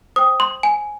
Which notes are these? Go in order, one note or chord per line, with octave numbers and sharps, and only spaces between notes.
C5 G5 D#6
C6
G#5